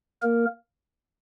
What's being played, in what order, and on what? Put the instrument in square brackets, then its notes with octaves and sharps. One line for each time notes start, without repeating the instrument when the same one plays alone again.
[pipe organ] A#3 A#4